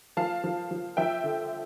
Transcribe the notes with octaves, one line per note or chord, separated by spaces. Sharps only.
F3 F5 A5
F3
F3
F3 E5 G5
D3